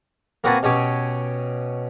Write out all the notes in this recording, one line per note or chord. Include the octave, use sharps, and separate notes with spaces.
A#3 C4 F#4 B4 G#5 A5
B2 C#4 G4 G#5 D6